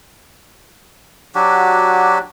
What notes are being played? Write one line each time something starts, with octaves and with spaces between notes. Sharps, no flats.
F#3 D4 F#4 G4